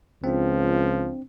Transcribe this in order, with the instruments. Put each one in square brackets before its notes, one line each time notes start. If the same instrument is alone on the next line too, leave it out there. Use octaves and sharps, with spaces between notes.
[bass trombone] C#2 [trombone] F3 [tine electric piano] C4 D4